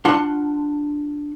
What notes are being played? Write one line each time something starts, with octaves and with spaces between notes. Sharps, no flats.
D4 F4 F#5 A5 C6